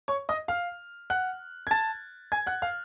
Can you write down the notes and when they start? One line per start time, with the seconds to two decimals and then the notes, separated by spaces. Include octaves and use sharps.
0.08 C#5 C#6
0.29 D#5 D#6
0.48 F5 F6
1.10 F#5 F#6
1.67 G#6
1.71 A5 A6
2.32 G#5 G#6
2.47 F#5 F#6
2.62 F5 F6